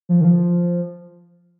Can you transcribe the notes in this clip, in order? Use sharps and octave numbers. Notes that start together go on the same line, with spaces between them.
F3
D#3
F3